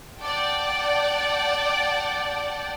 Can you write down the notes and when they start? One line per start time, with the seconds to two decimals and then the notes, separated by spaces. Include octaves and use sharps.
0.20 D5 F#5 G5 A5